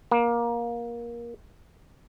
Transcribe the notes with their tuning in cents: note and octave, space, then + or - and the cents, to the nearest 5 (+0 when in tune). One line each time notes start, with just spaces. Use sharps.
A#3 +20